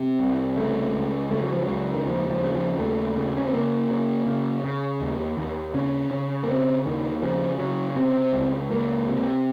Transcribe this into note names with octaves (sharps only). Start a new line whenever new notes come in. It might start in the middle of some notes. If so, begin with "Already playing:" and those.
Already playing: C3
C2
C#3 A3
C#2
C#3 A3
F#3
F3
F#3
C#2
D#3
D#2 F3
F3
C#3
F3
D#2 A3
C#3
C#4
C4
C#3 A#3
C#3
C#3
C#3
D#2
D#2
C#3 C#4
C#3
A#3
C#3 C4
D#2 D#3
C#3 F3
C#3 F#3
C3 C4
C#2
C#2 A#3
C3